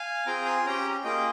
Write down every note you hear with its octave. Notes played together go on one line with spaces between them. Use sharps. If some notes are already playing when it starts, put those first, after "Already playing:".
Already playing: F5 G#5
C4 F4 G#4 G5 A#5
G#5 C6
C#4 G4 G5 A#5
A#3 F4 G#4 D#5 G5